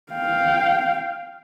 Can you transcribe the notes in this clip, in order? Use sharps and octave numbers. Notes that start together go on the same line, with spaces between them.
F5 G5